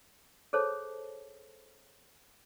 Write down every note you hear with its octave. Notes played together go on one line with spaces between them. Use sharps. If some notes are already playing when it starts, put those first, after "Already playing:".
G#4 A4 C5 C#5 A5